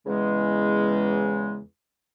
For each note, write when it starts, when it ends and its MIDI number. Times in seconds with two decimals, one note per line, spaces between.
0.06 1.59 40
0.06 1.59 49
0.06 1.59 56